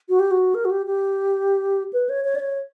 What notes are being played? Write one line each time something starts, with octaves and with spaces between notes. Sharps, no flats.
F#4
G4
F#4
A#4
F#4
G4
G4
B4
C#5
C#5
D5
C#5